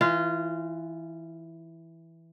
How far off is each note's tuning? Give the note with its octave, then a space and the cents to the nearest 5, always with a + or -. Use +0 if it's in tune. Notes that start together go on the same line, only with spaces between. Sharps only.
E3 +0 F4 -20